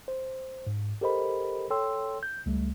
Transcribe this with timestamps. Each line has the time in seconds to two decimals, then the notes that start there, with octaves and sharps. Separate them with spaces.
0.08 C5
0.67 G#2
1.01 G4 A4 A#4 C5 D#5 B5
1.70 A4 C#5 G5 C6 E6
2.23 G6
2.46 C#2 G3 A3